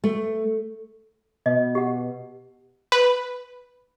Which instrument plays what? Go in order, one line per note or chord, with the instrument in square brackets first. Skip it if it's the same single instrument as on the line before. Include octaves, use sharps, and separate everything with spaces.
[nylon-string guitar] A3
[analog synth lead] B2 [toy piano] D#5
[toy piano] G4 F#5
[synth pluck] B4